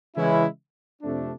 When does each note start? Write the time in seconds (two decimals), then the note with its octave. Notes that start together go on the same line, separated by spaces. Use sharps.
0.15 C#3 E3 G#3 C#4 E4
1.01 F2 C3 F3 A3 D4